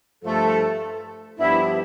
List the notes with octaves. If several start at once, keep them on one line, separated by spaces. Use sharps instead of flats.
G2 F3 A3 A4
G2 F3 B3 D4 E4 G4